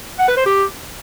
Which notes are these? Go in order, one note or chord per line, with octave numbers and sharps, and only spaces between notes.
F#5
B4
C5
G4